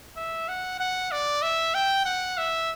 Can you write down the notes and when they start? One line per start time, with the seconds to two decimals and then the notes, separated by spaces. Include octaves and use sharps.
0.17 E5
0.48 F#5
0.80 F#5
1.12 D5
1.42 E5
1.74 G5
2.05 F#5
2.38 E5